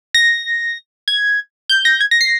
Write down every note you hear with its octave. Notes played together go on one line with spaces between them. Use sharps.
A#6
G#6
G6
A#6
G#6
A#6
C7